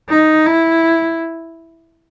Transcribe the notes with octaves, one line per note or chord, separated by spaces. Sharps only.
D#4
E4